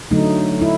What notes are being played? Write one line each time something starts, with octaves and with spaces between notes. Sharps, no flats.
D3 F#3 A3 D#4
E4